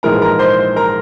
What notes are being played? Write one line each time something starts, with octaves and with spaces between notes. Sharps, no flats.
A#1 G#2 E3 G#3 A#4 A#5
A#4 A#5
C5 C6
A#4 A#5